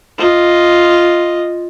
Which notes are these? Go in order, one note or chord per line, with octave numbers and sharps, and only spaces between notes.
F4 D#5